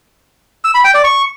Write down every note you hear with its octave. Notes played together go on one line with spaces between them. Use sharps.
E6
B5
G5
D5
C#6